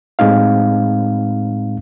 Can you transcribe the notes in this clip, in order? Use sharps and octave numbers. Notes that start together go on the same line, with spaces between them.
A2 G#3 C4 D#4 F5